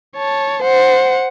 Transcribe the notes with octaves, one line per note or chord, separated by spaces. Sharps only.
C#5 A5
C5 F#5